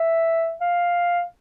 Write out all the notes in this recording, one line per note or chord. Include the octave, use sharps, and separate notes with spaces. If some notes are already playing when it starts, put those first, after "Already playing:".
Already playing: E5
F5